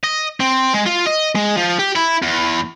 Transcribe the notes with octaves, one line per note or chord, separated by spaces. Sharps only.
D#5
C4
G#3
F4
D#5
G#3
F3
G4
E4
E2